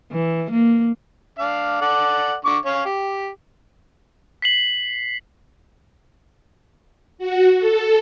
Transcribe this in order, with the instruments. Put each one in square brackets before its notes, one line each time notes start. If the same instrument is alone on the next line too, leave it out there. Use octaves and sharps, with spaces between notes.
[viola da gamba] E3
A#3
[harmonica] D4 F5
A4 D5 F#5
D3 C#6 D6
C#4 C#5 F5
G4
[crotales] B6 C7 F#7
[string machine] F#4
A4